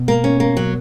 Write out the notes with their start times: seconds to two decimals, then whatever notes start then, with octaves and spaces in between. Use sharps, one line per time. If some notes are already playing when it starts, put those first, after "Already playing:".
Already playing: B2
0.08 A#3
0.24 C#4
0.40 A#3
0.57 F#3